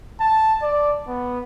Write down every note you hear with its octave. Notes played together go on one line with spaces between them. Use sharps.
A5
D5
B3